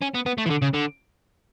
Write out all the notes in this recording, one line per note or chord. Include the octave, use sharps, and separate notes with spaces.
C#4
B3
B3
A3
E3
D3
C#3
D3